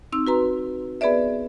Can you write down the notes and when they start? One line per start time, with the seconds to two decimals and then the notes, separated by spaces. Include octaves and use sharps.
0.12 C4 D#4 E6
0.27 F#4 B4 A#5 C6
1.01 B3 G#4 B4 D5 E5